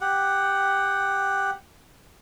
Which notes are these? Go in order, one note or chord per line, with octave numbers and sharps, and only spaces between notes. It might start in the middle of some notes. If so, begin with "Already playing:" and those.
G4 F#5